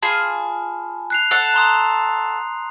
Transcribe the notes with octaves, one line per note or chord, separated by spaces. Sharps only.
F4 G#4 A5 B5
F#6 C7 F7
A4 F#5
A#5 C6 D#6